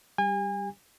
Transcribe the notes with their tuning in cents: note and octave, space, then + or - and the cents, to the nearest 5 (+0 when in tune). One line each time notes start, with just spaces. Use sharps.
G3 +0 G4 +15 G#5 -35